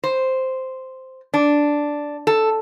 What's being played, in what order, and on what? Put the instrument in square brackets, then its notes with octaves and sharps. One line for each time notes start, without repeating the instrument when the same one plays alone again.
[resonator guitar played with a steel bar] C5
D4
A4